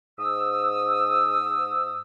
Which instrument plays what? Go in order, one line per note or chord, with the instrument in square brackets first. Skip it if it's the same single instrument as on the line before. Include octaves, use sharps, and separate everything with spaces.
[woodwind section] G#2 D#6 E6